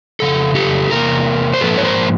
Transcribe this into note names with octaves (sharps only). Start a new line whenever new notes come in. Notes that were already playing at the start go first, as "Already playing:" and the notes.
F2 C#3 A4
G4 A4
E2 C3 A#3 A#4
C5
G#2 F3 A#3 A4 B4
C#5
A#4 C5